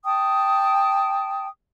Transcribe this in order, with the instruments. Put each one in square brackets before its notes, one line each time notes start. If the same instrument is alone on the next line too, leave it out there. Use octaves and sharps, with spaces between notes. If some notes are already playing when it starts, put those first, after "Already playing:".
[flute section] G5 A5 D#6